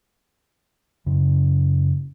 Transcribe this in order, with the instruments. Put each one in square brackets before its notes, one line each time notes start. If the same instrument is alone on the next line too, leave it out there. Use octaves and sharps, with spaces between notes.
[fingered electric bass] F#2 C#3 C#4